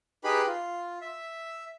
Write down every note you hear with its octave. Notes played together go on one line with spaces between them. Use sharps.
D#4 G4 G#4 B4 B5
F4
E5